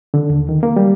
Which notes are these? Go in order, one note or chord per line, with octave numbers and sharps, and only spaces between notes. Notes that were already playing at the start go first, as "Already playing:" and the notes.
D3
D#2
D#3
A#3
G3